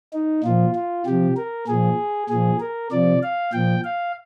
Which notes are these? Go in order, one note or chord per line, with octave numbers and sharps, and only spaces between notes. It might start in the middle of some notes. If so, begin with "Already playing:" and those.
D#4
A#2 F3 F4
F4
C3 F3 G4
A#4
A#2 F3 G#4
A#2 F3 G#4
A#4
C3 F3 D5
F5
A#2 F3 G5
F5